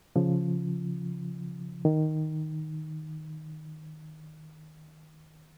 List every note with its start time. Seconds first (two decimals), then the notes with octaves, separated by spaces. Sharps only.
0.16 C#3 F3
1.85 D#3